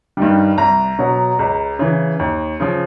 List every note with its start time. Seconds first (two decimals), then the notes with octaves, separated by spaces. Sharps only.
0.17 G2 D#3 G3
0.58 C2 A#5
0.99 B2 F#3
1.39 C#2
1.79 C#3 E3
2.19 D#2
2.60 C#3 F3